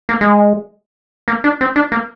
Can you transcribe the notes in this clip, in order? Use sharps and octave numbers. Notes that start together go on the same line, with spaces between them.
A#3
G#3
A#3
D4
C4
D4
A#3